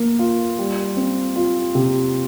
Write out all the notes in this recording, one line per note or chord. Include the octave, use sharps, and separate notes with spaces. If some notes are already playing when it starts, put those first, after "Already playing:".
Already playing: A#3
F4
G3
C4
F4
C3